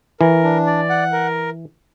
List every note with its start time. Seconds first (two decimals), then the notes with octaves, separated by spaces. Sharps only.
0.20 E3 A#4
0.43 D4
0.66 D5
0.90 F#5
1.12 A#4